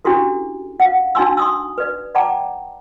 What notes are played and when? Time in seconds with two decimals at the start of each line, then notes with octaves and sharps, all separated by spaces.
0.05 C#4 D4 E4 F#4 G4 A4
0.80 F5 F#5
1.15 D4 D#4 F#4 G#5 C6 E6
1.37 C6 D#6 E6
1.78 B4 D5
2.15 D5 F#5 G5 A5 A#5 D6